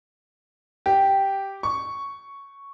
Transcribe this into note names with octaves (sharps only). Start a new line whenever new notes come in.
G4
C#6